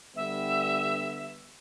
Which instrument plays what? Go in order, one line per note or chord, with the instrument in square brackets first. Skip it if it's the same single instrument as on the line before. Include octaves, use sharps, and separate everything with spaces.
[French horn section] D3 G3 B3 [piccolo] E5